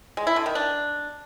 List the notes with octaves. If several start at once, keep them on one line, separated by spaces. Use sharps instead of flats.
G#3
E4
D3
D#3
D4